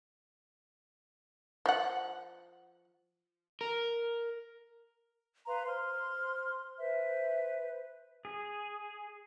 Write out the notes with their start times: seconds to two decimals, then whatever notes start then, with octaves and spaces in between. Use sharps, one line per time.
1.66 F3 F#5
3.61 A#4
5.47 B4 F5 A#5 C6
5.67 C5 C6 F6
6.78 B4 C5 E5
8.25 G#4